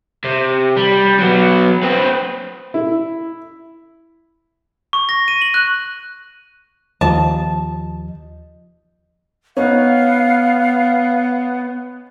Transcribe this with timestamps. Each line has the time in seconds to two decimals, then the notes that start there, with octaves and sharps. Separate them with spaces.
0.24 C3
0.77 G3
1.19 F#3 B3
1.83 C4 B4
2.74 E4
4.93 C#6
5.09 A#6
5.28 D#7
5.42 F#7
5.54 F#6
7.01 D#2 F3 D#5 A5
9.57 B3 C#4 D#4 F5